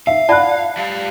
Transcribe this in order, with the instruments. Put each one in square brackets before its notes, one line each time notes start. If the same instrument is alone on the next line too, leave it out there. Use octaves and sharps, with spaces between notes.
[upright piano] E5 [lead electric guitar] F5
[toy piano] F4 D5 A5 [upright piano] F#5 F#6
[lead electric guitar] G3 F5